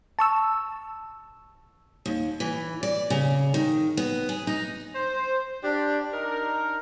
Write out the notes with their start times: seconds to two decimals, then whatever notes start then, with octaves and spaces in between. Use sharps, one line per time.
0.19 A5 C#6 E6
2.06 D#2
2.40 E3
2.83 D5
3.10 C#3
3.54 D#3
3.97 B3
4.29 G#4
4.47 D#4
4.95 C5
5.64 D4 G4
6.13 D4 D#4 A#4